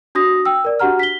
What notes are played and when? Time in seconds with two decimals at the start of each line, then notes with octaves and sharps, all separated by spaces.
0.15 D4 F#4 D#6 A#6
0.45 G5 E6
0.65 A#4 D5
0.80 D4 F#4 G4 F#5 A#5 F6
0.99 B6 G7